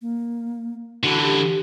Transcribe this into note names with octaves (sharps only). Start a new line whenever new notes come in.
A#3
D3 E3 F#4
G4